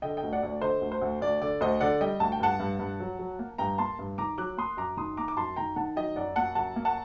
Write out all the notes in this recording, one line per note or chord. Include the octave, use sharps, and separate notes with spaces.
D3 D#5 G5
D#5 G5
D2
D5 F#5
D2 D5
D3 C5 D#5
D2
C5
D2
D2 D5
D3 D5
D2 C5 D#5
D3 D5 F#5
G3 D#5 G5
D2 A5
G5
G2 F#5 A5
G2
G2
F#3
F#3
A#3
G2 G5 A#5
A#3 A5 C6
G2
D#3 A#5 D6
F#3 D6 F#6
A#3 C6 D#6
F#2 A#5 D6
D#3 C6 D#6
A#3 A#5 D6
D6
F#2 A5 C6
D#3 G5 A#5
D#3 F#5 A5
F#3 D#5 G5
F#2 D5 F#5
A#3 F#5 A5
F#2 F#5 A5
A#3
F#5 A5